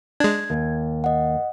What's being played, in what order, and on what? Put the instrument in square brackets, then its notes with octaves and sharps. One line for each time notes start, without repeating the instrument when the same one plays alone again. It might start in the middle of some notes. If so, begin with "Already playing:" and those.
[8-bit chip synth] G#3 D4 [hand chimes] G#6
[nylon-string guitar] D#2
[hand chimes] D#5 F#5